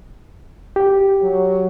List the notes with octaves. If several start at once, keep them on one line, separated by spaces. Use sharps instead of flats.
G4
F#3